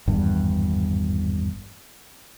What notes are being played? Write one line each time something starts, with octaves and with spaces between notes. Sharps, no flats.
G#1 E2 G2